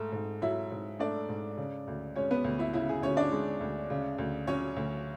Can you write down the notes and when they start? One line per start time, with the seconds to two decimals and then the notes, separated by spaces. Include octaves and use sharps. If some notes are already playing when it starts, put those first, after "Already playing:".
Already playing: G#2 A3
0.12 G#2
0.42 F#3 E4 E5
0.71 G#2
0.99 A3 D4 D5
1.29 G#2
1.57 C#3
1.88 D2
2.16 G#3 C#4 C#5
2.31 B3 B4
2.44 D2
2.59 E4 E5
2.73 C#3 E4 E5
2.89 G#4
3.02 D2 C#4 C#5
3.17 D4 D5
3.32 G#3
3.61 D2
3.90 C#3
4.18 D2
4.47 F#3 C#4 C#5
4.77 D2